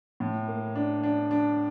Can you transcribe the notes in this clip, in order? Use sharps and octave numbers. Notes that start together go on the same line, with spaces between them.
A2
A#3
D4
D4
D4